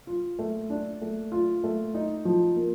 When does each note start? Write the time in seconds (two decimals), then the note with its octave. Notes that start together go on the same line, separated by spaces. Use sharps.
0.07 F4
0.39 A3
0.70 D4
1.01 A3
1.32 F4
1.64 A3
1.94 D#4
2.25 F3
2.56 A#3